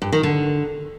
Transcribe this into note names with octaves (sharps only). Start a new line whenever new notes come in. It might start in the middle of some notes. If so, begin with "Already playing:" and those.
G2
D#3
D3